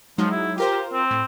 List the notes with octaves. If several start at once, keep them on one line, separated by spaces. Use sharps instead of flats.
F3 F#3 G#3 D#4
E4
F4 G4 A#4 C5
C4
A2